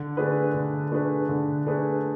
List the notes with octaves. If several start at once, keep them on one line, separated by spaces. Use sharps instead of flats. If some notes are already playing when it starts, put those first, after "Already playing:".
Already playing: D3
A3 D4 G#4 B4
D3
A3 D4 G#4 B4
D3
A3 D4 G#4 B4